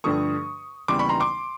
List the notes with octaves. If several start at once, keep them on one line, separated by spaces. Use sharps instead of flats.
G2 D3 F3 A3 C#6 D#6
D#2 C#3 E3 G3 B3 C6 D6
B5 C#6
A#5 C6
C6 D6